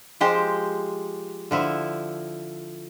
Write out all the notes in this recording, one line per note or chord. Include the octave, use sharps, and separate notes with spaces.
F3 G#3 G4 C5
D3 F3 E4